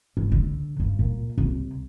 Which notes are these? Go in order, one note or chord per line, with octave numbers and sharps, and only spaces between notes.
G#2
D3
G2
A#2
C2